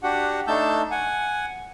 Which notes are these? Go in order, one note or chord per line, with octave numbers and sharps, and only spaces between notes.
D4 F#4 G4 F#5
A3 D4 D#4 A5 E6 G6
F#5 G#5